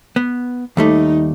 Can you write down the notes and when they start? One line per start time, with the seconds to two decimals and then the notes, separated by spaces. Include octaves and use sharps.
0.16 B3
0.77 D#2 G3 A3 D#4